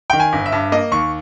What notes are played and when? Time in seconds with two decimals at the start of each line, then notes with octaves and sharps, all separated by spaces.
0.10 D#3 G5
0.20 G#5
0.33 G1
0.46 E5
0.52 G2
0.72 A#3 D#5
0.92 D#2 C#6